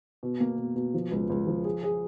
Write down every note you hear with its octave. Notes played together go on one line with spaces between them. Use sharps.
B2
A#3
B2
B2
F3
C#2
C#2
F3
G#4
G#4